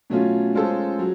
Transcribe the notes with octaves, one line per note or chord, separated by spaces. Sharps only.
B2 F#3 A3 C#4 F4
G#3 C#4 F4 A4 C5
F#3